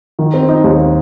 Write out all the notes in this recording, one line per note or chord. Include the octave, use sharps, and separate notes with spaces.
D#3
C4
D#4
D#2